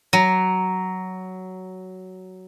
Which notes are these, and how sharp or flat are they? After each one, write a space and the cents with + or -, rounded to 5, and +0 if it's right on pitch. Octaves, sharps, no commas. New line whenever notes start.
F#3 +10